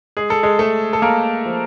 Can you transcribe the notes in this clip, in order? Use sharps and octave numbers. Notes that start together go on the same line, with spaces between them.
G#3 G#4
A4
G#3 G#4
G#3 A3 A4
A4
G#3 A#3 A#4
F3